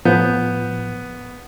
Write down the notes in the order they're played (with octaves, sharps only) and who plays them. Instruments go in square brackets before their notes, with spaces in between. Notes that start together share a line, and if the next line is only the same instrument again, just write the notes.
[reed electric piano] A2 F3 G6 [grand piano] B3